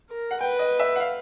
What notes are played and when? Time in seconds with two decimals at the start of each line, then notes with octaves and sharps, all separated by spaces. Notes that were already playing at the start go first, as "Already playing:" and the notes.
0.10 A#4
0.31 F#5
0.40 B4 G5
0.59 D#5
0.79 E5
0.96 F#5
1.00 F5